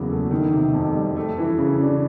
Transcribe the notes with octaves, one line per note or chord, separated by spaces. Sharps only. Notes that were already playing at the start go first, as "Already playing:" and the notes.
Already playing: E2 C#3 F#3 A#3
A3
D#3
C3
F2
G3
A3
E3
C#3
D4